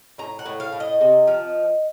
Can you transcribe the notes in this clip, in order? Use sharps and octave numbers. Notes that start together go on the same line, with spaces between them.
A2 A#5
F#5
A2
F5
A2
D#5
C3
F3